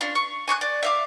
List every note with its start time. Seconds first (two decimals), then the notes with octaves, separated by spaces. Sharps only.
0.01 C#4 D4 F4
0.15 C#6
0.48 G#5 C#6 D6 F#6
0.61 D5
0.83 E5 F5 D6